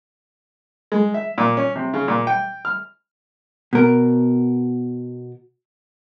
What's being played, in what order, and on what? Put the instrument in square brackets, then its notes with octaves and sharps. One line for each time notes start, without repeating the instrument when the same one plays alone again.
[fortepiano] G#3
E5
A#2
C#4
C3
C#3
A#2
G5
F6
[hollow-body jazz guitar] B2 A#4